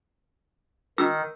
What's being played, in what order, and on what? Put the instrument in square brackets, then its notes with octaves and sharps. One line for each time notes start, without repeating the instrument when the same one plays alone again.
[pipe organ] D#3 [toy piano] E6